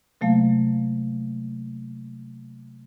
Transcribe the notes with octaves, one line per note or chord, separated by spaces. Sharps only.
C3 F#3 A3 A#3 F5